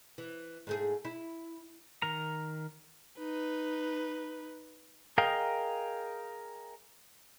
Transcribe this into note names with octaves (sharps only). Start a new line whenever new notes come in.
E3
G#2 A3 G#4
E4
D#3 A#4 A#5
D#4 B4
G#4 A#4 D#5 F5 G5